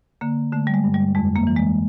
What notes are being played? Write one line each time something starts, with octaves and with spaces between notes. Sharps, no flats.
D3 A#3
D3 A3
G3
G#3
G2
G3
F2 G#3
A#3
E3
G#3